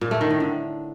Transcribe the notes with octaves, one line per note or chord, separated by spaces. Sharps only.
A#2
A3
D#3
A2
D3